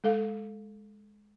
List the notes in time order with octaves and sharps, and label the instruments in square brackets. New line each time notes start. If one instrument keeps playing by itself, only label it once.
[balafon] G#3 A4 F5